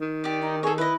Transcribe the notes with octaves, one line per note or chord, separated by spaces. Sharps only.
D#3
G4 D5
D#4
G#4 A4 C#5
E4 B4 D#5